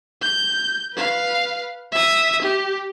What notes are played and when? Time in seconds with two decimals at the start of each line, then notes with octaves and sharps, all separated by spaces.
0.21 G6
0.94 B4 F5
1.92 E5 D#6
2.42 G4